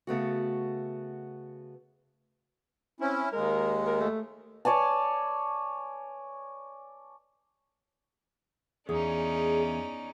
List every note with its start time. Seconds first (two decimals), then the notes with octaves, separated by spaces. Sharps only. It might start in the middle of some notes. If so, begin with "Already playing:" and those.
0.07 C#3 A3 B3 F#4
3.00 C4 C#4 E4
3.33 D#2 G#3 A#4
3.87 A#4
4.01 A3
4.65 C#5 D5 G#5 A5
8.89 E2 C#4 D#4 G#4 D5